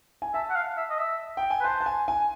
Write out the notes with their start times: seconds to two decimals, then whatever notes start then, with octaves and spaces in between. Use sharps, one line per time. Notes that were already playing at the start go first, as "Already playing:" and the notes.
0.22 G#5
0.34 E5 A5
0.50 F#5
0.56 F5
0.77 E5
0.90 D#5
0.99 E5
1.37 G5
1.50 G#5
1.61 B4
1.64 C5 A5
1.80 A5
1.86 G#5
2.08 G#5